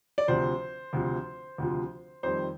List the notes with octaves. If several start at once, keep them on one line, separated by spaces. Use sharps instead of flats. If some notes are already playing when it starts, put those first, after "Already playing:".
D5
D2 C3 F3 C5
D2 C3 F3
D2 C3 F3
F2 D#3 G3 C5